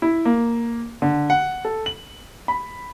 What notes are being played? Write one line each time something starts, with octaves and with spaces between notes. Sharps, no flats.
E4
A#3
D3
F#5
A4
F#7
B5